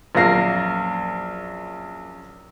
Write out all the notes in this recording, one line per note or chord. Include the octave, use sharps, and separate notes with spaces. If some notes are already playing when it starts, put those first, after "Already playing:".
A#1 F#2 A#3 A#6 C7